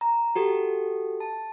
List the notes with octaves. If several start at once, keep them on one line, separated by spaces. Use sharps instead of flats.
A#5
F#4 G4 A4
A5